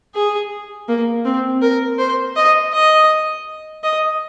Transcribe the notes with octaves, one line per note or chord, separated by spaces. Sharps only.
G#4
A#3
C4
A#4
C5
D#5
D#5
D#5